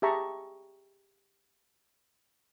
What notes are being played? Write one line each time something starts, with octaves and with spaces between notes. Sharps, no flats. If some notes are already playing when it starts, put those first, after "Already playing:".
G4 G#4 E5 A5 A#5 C#6